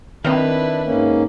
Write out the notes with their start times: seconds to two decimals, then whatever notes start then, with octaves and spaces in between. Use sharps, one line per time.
0.24 D#3 C4 D4 E4 B4 D#5 F5
0.84 G#2 A#3 C#4